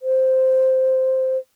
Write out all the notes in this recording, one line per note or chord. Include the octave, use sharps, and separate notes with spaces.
C5